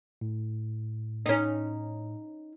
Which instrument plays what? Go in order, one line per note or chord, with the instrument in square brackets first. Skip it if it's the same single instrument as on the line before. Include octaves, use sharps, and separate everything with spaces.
[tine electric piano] A2
[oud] C#4 D#4